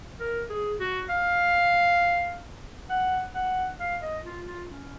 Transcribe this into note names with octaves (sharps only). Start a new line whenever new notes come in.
A#4
G#4
F#4
F5
F#5
F#5
F5
D#5
F4
F4
C#4